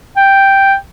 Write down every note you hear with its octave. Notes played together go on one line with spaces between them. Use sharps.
G5